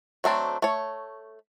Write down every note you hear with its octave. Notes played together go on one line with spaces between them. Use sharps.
F#3 A3 C4 D4
A3 C#5